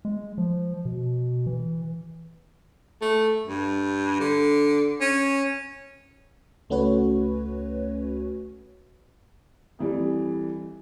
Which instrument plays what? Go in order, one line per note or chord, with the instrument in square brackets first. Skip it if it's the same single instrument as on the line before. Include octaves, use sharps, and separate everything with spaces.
[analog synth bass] G#3
F3
B2
E3
[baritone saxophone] A3
G2
D3
C#4
[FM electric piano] C#2 A3 C#4 F#4 B4 C#5
[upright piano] F2 E3 G3